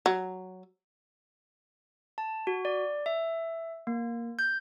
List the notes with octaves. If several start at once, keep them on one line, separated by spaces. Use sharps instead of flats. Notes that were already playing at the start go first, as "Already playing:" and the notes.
F#3
A5
F#4
D5
E5
A#3
G6